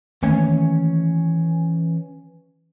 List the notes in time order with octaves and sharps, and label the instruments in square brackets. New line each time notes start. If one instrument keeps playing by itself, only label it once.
[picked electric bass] D#3 A3 A#3 [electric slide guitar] E3 C#4 C#5